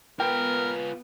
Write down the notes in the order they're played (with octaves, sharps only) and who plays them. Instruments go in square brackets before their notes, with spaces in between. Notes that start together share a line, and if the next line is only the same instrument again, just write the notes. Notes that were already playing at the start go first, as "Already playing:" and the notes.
[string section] B3 [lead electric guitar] F4 B4 [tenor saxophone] A#4 [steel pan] G5